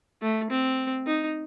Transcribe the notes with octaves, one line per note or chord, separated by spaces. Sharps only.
A3
C4
D#4